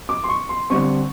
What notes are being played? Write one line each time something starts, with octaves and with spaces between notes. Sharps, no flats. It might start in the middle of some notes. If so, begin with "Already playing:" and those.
D6
C6
C#6
C6
D3 G3 C4 C#6